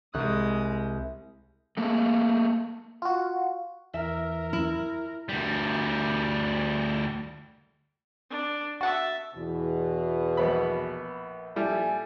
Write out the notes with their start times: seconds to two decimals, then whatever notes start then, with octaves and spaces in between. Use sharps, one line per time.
0.14 C2 G#3 D#6 F#6
1.77 A3 A#3 G#4
3.02 F4 F#4
3.94 E2 E3 A#4 E5
4.53 E4
5.29 D2 G3
8.30 D4
8.81 F#4 E5 F#5 A5
9.35 E2 B2
10.37 A#1 B3 B5
11.56 A#1 G3 E4 A4 G#5